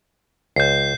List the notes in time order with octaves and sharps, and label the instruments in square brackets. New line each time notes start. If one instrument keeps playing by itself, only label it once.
[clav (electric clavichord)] C#2 [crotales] G6 C7